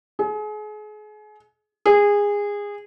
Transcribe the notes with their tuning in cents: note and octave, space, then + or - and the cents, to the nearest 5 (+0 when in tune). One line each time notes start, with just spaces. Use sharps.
G#4 +35
G#4 -20